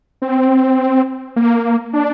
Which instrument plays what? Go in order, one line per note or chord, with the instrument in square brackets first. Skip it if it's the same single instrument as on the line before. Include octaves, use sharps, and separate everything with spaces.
[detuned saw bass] C4
A#3
D4